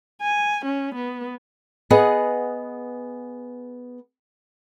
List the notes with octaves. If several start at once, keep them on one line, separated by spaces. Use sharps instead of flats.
G#5
C#4
B3
B3 G#4 D#5 F#5